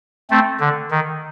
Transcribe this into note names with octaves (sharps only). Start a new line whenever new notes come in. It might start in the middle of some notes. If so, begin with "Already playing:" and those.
A3 C4
D3
D#3